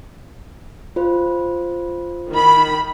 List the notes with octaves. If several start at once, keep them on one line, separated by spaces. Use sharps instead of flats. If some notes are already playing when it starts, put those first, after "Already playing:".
F4 C5
D#3 B5